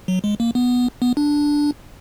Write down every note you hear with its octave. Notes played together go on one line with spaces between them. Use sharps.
F#3
G#3
A#3
B3
B3
D4